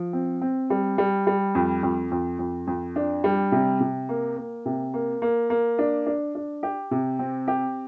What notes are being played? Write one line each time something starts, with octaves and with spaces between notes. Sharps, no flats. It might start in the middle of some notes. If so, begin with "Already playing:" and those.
Already playing: F3
C4
C4
G3
G3
G3
F2
F2
F2
F2
F2
D4
G3
C3
C3
A#3
A#3
C3
A#3
A#3
A#3
D4
D4
D4
G4
C3
C4
G4